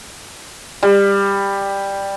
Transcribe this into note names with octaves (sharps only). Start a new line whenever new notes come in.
G3